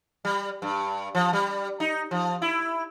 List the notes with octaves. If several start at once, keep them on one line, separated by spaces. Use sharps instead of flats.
G3
G2
F3
G3
D#4
F3
E4